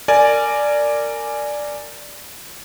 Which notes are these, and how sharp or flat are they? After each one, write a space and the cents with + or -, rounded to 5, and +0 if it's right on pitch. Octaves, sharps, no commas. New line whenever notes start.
A#4 -20 D5 +0 G#5 +5